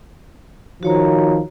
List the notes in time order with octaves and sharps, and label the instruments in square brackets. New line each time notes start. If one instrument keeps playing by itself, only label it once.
[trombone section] D#3 F3 [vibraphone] F#4 C#5 A#5